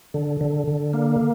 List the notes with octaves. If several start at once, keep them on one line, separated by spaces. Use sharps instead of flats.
D3
D3
D3
A#3